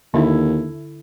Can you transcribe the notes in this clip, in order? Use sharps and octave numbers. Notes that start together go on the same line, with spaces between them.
D#2 D3 E4